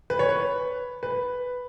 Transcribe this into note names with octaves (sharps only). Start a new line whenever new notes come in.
B4
C#5
B4
B4